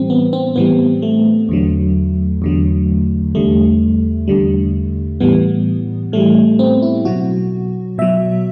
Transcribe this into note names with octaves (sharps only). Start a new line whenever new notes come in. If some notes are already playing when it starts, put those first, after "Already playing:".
Already playing: A2 E3 G3 C4
B3
C4
A2 E3 G3 B3
A3
E2 D3 F#3
E2 D3 F#3
E2 D3 G3 A3
E2 D3 G3
A2 E3 G3 B3
A2 E3 G3 A3
C4
E4
B2 F#3 F#4
B2 F#3 E5